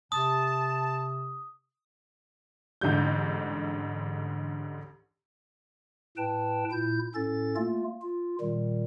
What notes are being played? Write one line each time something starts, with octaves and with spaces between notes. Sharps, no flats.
C3 A5 D#6
A1 G#2 D3 G3 G6
A2 B4 G5 A5
A#2 E4 G6
A2 C#4 A4 A6
A3 A#3 F4
F4
A#2 D#3 G3